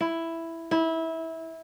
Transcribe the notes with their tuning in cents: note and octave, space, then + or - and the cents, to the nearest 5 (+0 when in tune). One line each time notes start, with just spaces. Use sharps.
E4 +5
E4 -20